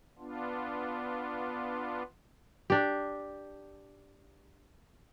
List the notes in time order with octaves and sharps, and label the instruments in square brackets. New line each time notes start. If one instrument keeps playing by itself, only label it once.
[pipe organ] B3 D4 F4
[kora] D4 G4